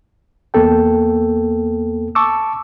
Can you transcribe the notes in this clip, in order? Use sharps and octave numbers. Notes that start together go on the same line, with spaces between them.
E2 A#3 B3 A4 G5
A5 C#6 D6 E6